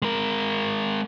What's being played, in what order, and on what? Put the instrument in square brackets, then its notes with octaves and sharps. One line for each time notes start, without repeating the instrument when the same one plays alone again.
[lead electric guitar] G#3 A#4